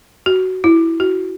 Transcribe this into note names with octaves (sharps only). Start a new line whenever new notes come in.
F#4
E4
F#4